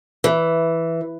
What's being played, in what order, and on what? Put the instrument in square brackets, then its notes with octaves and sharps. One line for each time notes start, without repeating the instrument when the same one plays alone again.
[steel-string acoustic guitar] E3